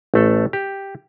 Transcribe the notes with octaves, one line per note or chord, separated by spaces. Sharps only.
A1 A3 A4
G4